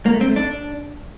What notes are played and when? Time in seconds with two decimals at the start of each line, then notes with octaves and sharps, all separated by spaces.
0.06 A#3
0.13 A3
0.21 C4
0.29 A3
0.36 D4